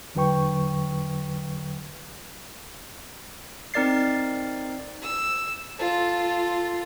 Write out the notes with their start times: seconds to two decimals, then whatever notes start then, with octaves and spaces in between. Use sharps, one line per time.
0.15 E2 D3 F#3 B4 G5 C#6
3.74 C4 D#4 A#4 D5 A6 C7
5.02 E6
5.78 F4 A4